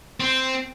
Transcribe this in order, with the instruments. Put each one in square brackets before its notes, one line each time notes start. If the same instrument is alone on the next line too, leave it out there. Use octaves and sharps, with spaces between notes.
[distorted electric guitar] C4